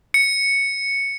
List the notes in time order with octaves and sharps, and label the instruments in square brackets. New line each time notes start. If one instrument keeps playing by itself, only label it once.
[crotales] C#7